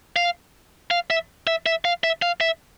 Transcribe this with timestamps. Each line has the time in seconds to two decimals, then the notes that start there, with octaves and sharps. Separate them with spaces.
0.16 F5
0.91 F5
1.10 E5
1.47 E5
1.66 E5
1.85 F5
2.04 E5
2.22 F5
2.41 E5